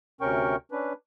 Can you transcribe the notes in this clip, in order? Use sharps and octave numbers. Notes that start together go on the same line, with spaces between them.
D2 C3 C#4 A#4 G5 C#6
C#4 D4 B4